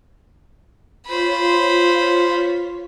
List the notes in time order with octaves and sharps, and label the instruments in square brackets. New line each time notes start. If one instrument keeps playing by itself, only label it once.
[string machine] F4 C#5 B6 [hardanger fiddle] C5 B5